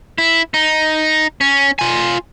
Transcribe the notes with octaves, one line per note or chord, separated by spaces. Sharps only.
E4
D#4
C#4
F4 G#5